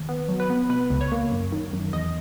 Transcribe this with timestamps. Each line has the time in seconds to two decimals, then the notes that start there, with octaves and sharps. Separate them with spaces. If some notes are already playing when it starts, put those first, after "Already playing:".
Already playing: D#2
0.09 B3
0.29 F#3
0.40 B4
0.50 B3
0.69 B2 B4
0.90 C#2
1.01 C#5
1.12 A#3
1.32 F#2
1.52 D#3
1.73 F#2
1.93 E2 D#5